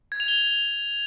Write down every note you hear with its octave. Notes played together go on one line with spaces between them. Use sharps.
G#6
F7
G7